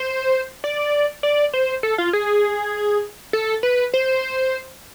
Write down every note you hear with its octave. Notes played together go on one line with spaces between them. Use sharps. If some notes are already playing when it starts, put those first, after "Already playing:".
Already playing: C5
D5
D5
C5
A4
F4
G#4
A4
B4
C5